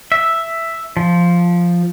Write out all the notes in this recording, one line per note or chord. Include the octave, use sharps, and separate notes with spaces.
E5
F3